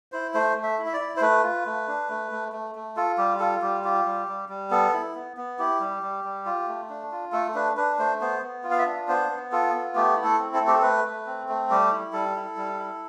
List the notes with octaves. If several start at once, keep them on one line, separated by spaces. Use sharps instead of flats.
E4 C5
A3 C5
A3
E5
E4
E5
D5
E4
C5
A3 B4
F4
A3
D4
A3
A3
A3
A3
F4 A4
G3 G4
F4 A4
G3 G4
F4 G4
G3
G3
G3
B3 A4
E4
B3
B3
E4 G4
G3
G3
G3
F4
A3
D4
F4
A3 A4
D4 B4
D4 B4
A3 C5
B3 C5
B3
F4
F5
E5
D4
B3 C5
B3
F4 A4
B3
A3 G4
E4
A4
C4
A4
A3
G4
A4
A3 B4
A3
C4
A3
G3 G4
E4
G3 A4
E4
G3
E4